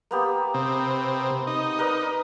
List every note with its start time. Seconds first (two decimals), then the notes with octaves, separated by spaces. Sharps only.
0.11 A#3 B3 G4
0.54 C3
1.47 D#4
1.78 A#4 B4 D5